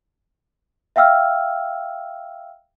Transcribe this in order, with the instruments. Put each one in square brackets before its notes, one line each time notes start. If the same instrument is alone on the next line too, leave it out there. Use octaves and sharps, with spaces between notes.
[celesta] E5 F5 G5 E6 F6